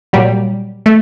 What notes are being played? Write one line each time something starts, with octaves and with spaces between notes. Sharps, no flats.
A#2 F#3 G3
A3